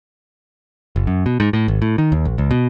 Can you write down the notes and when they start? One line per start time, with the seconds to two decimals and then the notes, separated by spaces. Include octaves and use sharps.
0.96 F#1
1.07 F#2
1.26 B2
1.40 G#2
1.53 A2
1.68 G#1
1.82 A2
1.98 D#3
2.12 D#2
2.25 A#1
2.38 C#2
2.51 B2